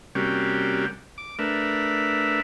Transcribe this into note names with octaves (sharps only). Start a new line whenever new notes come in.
C3 G3 A#3 C#4 F#4 G4
D6
A3 D4 A#4 B4 E5